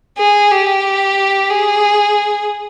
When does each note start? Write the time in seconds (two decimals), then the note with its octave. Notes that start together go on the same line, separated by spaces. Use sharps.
0.18 G#4
0.51 G4
1.50 G#4